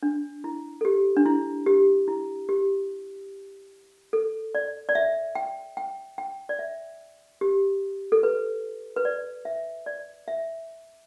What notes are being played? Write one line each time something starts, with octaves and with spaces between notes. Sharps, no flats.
D4
E4
A4
G4
D4
E4
G4
E4
G4
A4
D5
D5
E5
G5
G5
G5
D5
E5
G4
A4
B4
B4
D5
E5
D5
E5